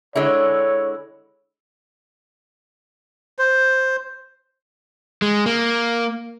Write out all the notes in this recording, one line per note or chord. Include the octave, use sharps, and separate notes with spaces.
D3 G#3 E4 C#5
C5
G#3
A#3